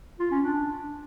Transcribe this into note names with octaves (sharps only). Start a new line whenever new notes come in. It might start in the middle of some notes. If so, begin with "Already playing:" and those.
F4
C#4
D4